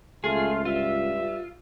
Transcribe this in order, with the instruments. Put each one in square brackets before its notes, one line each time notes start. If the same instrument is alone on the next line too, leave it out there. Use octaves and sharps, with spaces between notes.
[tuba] C#2 [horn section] A3 F4 [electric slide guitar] G#4
[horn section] G2 E5 [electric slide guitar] F4